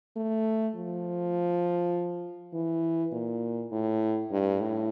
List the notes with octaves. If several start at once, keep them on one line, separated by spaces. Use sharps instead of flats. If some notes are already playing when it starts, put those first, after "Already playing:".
A3
F3
E3
A#2
A2
G2
A2